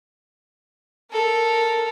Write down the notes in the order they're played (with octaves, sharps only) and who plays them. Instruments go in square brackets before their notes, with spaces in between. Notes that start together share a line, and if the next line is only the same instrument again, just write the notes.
[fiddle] A4 A#4